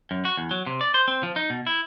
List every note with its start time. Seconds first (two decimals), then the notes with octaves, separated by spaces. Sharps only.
0.11 F#2
0.25 F#4
0.37 E2
0.51 F#3
0.66 C3
0.81 D5
0.94 C5
1.08 C4
1.23 F3
1.36 D#4
1.50 B2
1.67 E4